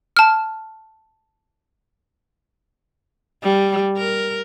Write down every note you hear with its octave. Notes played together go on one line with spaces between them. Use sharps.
A5 F6
G3
A#4